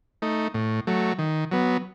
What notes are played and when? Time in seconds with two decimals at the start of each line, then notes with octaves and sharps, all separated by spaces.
0.22 A3 D#4
0.54 A2
0.87 F#3 A3
1.19 D#3
1.52 F#3 B3